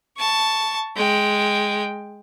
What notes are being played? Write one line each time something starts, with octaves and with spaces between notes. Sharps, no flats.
A5 C#6
G#3 G5